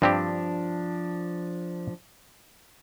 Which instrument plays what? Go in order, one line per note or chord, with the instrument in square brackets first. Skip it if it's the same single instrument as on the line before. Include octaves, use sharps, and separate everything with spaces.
[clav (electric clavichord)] G2 C4 G4 [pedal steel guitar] F3 D4